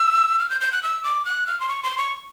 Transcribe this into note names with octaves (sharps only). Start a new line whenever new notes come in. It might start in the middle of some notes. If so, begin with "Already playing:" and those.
Already playing: E6
F6
G6
G6
F#6
E6
D6
F#6
F6
C6
C#6
C6
C#6